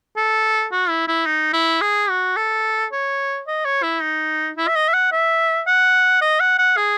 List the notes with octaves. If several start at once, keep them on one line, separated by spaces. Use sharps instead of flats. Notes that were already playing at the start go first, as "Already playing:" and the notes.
A4
F#4
E4
E4
D#4
E4
G#4
F#4
A4
C#5
D#5
C#5
E4
D#4
E4
E5
D#5
E5
F#5
E5
F#5
D#5
F#5
F#5
G#4